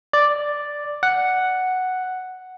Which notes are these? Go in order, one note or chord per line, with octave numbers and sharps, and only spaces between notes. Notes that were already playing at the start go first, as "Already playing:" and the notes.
D5
F#5